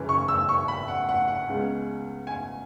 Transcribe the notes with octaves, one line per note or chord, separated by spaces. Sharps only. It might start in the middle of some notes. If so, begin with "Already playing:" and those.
Already playing: F#1 F#2 C#3 E3
C#6
E6
C#6
B5
F#5
F#5
F#5
C#2 C#3 G#3 B3
G#5